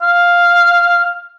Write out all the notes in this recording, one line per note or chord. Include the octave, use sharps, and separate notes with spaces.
F5